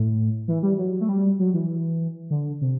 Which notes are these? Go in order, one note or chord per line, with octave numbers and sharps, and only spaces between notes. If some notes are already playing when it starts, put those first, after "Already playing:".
Already playing: A2
E3
G3
F#3
A3
G3
F#3
E3
D3
C3